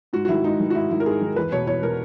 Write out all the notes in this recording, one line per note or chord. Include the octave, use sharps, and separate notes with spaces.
G#2 F#4
F#4
D#3 E4
G#2 D#4
D#3
F#4
G#2 E4
D#3 E4
A#4
G#2 G#4
D#3
E2 B4
B2 C#5
E2 C#5
B2 A#4